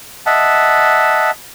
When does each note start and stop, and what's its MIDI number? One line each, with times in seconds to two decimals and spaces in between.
0.26 1.31 75
0.26 1.31 76
0.26 1.31 78
0.26 1.31 81